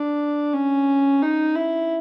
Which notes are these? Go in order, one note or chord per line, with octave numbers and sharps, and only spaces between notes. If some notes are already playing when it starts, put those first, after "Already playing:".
Already playing: D4
C#4
D#4
E4